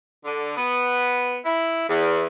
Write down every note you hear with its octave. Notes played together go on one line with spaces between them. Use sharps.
D3
B3
E4
E2